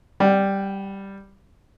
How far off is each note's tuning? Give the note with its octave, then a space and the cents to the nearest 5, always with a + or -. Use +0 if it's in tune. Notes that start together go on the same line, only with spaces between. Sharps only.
G3 +0 F#5 +35